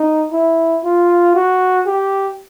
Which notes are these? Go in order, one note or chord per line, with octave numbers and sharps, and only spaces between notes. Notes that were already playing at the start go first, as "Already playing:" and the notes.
Already playing: D#4
E4
F4
F#4
G4